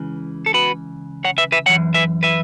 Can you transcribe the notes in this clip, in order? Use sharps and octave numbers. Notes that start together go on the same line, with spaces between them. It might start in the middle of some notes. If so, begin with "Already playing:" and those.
Already playing: C#2 C#3 E3
A4
F#4 B4
C#5 F#5
B4 E5
B4 E5
F#2 E3 C#5 F#5
B4 E5
B4 E5